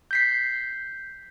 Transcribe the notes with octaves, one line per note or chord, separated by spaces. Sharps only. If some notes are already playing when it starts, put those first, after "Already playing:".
G6 B6 C7